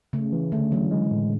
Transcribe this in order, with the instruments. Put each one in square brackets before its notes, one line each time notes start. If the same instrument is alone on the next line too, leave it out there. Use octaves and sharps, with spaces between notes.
[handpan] C#3 [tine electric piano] A3
[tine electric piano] E3
[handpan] D3 [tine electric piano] A3
[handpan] E3 [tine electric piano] F#3
[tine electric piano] G#3
A2